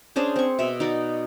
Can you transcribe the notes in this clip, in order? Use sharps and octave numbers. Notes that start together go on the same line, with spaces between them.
C#4 D4 G#4 C5
C4 C#6
B2 E5
D#4 F#4 D5